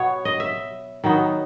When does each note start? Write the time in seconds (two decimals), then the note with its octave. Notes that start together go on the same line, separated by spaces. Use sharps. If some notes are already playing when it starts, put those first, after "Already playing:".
Already playing: B2 F#3 B3 C#5
0.25 D#5
0.40 E5
1.04 D#3 F#3 B3 D#4